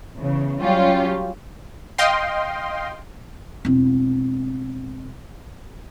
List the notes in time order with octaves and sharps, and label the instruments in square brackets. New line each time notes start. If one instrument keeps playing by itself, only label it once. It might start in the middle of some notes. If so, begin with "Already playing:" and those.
[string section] E2 C#3
F#3 G3 C#4 F4 G4
[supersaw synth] D#5 F5 G5 C6
[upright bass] E1 C4